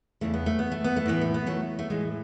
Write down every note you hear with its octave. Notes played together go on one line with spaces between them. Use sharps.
E2 C#3 E3 A3
B3
A3
B3
A3
B3
A3
A2 E3 B3
A3
B3
F#3 A3
A3
A2 E3 G#3